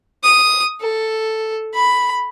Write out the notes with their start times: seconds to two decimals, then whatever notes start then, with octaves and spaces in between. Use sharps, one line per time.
0.23 D#6
0.81 A4
1.74 B5